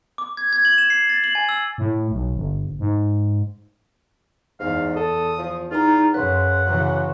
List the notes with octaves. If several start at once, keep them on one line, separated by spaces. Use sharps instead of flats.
D6
G#6
G#6
F#7
E7
C7
A6
F#7
G#5
E6
A2
B1
G1
G#2
E2 G#2 F5
A4 D#6
F3
E2 D#4 F4 A#5
F#2 C#3 B4 F#5 C6
C#3 E3 F#3